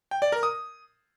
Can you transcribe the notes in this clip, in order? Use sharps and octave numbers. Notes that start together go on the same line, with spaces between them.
G5
D5
A#4
D#6